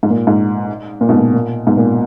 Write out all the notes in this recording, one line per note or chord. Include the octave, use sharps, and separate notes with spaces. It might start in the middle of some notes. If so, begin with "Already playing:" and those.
G#2
A#2
G#2
A#2
G#2 B2
A#2
A#2
G#2 B2
A#2